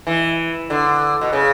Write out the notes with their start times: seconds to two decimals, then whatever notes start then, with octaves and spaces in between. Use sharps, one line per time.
0.07 E3
0.70 D3
1.21 B2
1.33 C#3